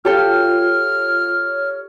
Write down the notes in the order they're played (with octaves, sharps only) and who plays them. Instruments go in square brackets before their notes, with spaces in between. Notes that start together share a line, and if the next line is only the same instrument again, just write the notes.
[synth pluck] F4 [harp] G4 A4 G5 [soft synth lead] C#5 [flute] F6